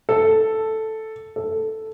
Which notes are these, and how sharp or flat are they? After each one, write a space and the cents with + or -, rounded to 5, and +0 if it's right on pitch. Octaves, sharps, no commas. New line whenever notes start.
A4 +0
A4 +0